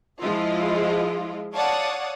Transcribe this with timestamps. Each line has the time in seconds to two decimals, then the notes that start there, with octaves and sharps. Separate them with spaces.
0.20 F3 G#3 E4 F4 D#5
1.55 C#5 D5 F5 F#5 A5 D#6